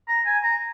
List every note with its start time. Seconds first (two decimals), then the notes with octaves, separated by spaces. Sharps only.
0.08 A#5
0.26 G#5
0.43 A#5